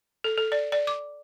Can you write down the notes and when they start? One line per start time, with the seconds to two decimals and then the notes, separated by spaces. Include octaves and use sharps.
0.24 A4
0.38 A4
0.52 D5
0.72 D5
0.87 D6